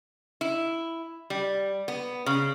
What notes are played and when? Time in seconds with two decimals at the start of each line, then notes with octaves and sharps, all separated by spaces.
0.41 E4
1.30 G3
1.88 B3
2.26 C#3